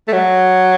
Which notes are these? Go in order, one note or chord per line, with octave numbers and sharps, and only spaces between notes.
A3
F#3